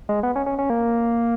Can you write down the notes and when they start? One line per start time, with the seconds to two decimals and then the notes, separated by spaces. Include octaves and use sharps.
0.09 G#3
0.23 B3
0.36 C#4
0.46 C#4
0.59 C#4
0.70 A#3